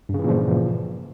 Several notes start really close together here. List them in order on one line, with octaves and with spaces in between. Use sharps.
G2 C#3 E3 A#2 F3